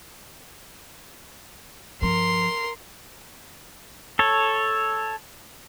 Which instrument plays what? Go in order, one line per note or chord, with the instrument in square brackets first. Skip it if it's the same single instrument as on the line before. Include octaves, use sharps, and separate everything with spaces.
[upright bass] G2 F3 [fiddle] A#4 C6
[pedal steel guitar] A4 C#5